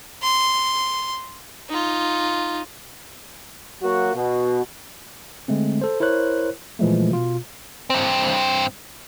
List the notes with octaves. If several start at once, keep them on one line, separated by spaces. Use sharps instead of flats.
C6
D#4 F4
F#3 A#3 F#4
B2
D3 G#3 A3 C4
A4 C5
E4 A#4 C5 C#5 F#6
A#2 E3 F3 G#3 A3
B2 F4
G2 C4